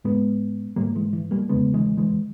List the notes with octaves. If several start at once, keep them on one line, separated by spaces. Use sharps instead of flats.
G#2 G#3 B3
G#2 G3 A#3
E3 G#3
E3
G3 A#3
E2 C#3 G#3 B3
E3 G#3
E3 G#3